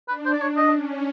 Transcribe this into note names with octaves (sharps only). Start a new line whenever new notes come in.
D4 B4
C5
D5
C#5
D#5
C#4